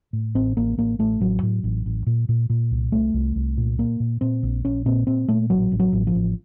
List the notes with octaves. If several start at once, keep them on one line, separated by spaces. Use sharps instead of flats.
A2
A1 C4
A1 A#3
A1 A#3
A1 A3
A1 F#3
A2
A1
A1
A#2
A#2
A#2
C2
C2 A3
C2
C2
A#2
A#2 A#3
A#2
A#2 C4
A#1
A#1 C#4
A#2 C4
A#2 C4
A#2 A3
A1 F#3
A1
F#3
A1
F3
A1